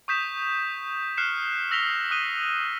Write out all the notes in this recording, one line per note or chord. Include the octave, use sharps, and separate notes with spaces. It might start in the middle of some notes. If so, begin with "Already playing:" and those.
C#6 D#6 G6 B6 E7
F6 F#6 C7 C#7 E7
E6 A#6 B6 F7 G7
D#6 F#6 D#7 G7